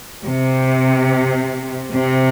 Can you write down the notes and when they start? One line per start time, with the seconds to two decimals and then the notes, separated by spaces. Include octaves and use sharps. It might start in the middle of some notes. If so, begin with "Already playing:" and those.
0.24 C3
1.93 C3